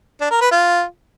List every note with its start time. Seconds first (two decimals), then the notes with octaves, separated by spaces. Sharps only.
0.21 D4
0.31 A#4
0.41 B4
0.52 F4